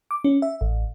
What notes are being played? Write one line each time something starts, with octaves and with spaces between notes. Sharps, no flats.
D6
C#4
E5
A1